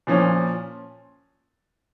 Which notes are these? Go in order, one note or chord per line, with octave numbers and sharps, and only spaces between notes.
A#2 F3 C#4